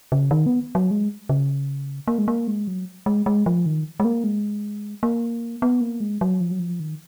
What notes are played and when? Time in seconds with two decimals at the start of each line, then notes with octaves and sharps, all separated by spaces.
0.12 C#3
0.31 D#3
0.46 B3
0.75 F#3
0.91 G#3
1.29 C#3
2.08 A#3
2.18 G#3
2.28 A#3
2.47 G#3
2.67 F#3
3.06 G#3
3.26 G#3
3.46 F3
3.66 D#3
4.00 G#3
4.05 A#3
4.24 G#3
5.03 A#3
5.62 B3
5.81 A#3
6.00 G#3
6.21 F#3
6.41 F3
6.51 F#3
6.59 F3
6.80 D#3